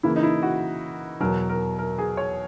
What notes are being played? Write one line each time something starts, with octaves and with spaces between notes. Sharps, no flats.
C#3 E3 A#3 E4
D#4
E4
F#4
E2 B2 F#3 A#4
A#4
A#4
G#4
C#5